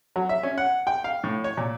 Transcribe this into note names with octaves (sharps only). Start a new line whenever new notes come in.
F#3
E5
C#4
F#5
G5
F5
A2
C#5
A#2